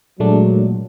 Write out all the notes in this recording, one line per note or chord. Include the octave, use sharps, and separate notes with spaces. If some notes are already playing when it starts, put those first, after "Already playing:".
A#2 F#3 G#3 A3 D4